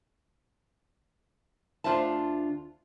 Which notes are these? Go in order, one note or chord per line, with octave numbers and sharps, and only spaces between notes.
D2 D4 F4 C5 E5 A5